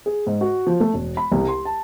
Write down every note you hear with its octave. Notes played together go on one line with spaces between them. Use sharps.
G#4
G#2
F#4
F3
A3
E1
B5
C2
C6
A5